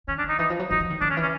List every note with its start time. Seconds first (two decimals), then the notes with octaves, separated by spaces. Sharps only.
0.08 D#3 C#4
0.19 D4
0.24 D#3 D#4
0.39 E3 D#4
0.50 F3
0.59 F#3
0.71 E3 D#4
0.80 F3
0.90 D#3
1.01 D#3 D4
1.11 C#4
1.17 E3
1.22 C#4